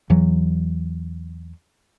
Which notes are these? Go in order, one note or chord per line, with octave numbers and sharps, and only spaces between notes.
E2 E3 F#3